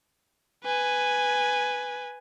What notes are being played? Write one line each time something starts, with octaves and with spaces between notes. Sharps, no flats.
B4 G#5